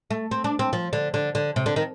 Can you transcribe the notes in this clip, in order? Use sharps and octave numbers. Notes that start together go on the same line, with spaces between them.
A3
C4
D4
C4
F3
D3
D3
D3
C3
D3
D#3